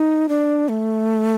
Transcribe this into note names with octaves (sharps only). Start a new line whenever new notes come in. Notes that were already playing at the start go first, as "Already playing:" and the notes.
Already playing: D#4
D4
A3